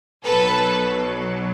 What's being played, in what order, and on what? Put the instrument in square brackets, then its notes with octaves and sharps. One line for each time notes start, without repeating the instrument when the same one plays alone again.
[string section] B1 B2 F#3 A4 B4